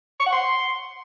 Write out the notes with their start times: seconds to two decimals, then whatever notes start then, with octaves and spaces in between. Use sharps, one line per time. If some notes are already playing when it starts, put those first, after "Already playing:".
0.20 C#6
0.26 F#5
0.32 C6